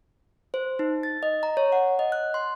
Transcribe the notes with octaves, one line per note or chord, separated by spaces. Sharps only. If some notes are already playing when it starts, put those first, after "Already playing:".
C5
D#4
A6
D#5
A#5
C#5
F#5
D#5
F#6
C6